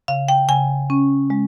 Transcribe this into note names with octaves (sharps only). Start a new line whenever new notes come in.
C#3 F5
G5
C#3 G#5
C#4
G#3